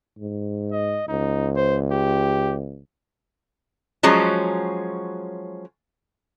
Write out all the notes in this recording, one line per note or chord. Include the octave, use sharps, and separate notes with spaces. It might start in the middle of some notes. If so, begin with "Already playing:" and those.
G#2
D#5
C#2 D#4
C5
G4
F3 F#3 G#3 C#4